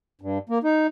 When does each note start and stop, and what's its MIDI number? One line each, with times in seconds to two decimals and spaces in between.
0.21 0.38 43
0.49 0.58 58
0.64 0.87 63